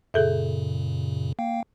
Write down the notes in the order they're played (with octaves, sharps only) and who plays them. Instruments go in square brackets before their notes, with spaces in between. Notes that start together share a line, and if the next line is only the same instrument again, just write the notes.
[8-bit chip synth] F#2 A#2 C#3 [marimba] G#4 A4 E5
[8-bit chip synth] A#3 F5 G5